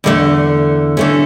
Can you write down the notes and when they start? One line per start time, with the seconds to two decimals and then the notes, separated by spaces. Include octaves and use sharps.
0.04 E2 D3 A3
0.97 D3 A3 C#4